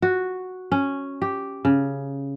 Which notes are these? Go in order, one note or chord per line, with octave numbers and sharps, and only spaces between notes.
F#4
C#4
G4
C#3